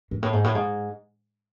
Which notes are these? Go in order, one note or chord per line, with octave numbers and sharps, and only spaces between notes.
G#2
A2
G#2
A2
G#2